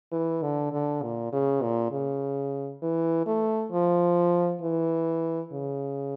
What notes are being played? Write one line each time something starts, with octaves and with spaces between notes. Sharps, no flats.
E3
D3
D3
A#2
C#3
A#2
C#3
E3
A3
F3
E3
C#3